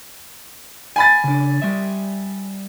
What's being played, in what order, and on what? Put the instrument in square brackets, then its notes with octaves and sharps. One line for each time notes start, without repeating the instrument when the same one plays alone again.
[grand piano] G#5 B5 A6
[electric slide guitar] C#3 D4
G3 E5